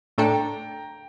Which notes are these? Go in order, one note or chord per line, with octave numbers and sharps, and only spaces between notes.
A2 A3 D4 A4 G5 A#5